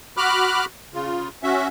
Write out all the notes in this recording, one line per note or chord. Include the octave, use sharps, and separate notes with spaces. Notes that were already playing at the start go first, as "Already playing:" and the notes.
F#4 B5 D6 F6 F#6
C#3 F4
C#4 F#4 E5